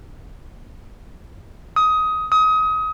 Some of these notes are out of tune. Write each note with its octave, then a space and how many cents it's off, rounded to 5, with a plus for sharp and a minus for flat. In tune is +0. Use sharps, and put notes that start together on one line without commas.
D#6 +15
D#6 +25